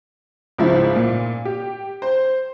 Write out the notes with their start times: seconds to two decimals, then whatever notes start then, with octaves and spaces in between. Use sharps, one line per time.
0.58 C#2 G#2 F3 E4
0.96 A#2
1.45 G4
2.02 C5